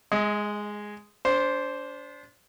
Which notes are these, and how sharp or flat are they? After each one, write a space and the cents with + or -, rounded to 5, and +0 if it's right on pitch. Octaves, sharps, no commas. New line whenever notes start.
G#3 +0 D#5 +30
D4 -30 C5 +0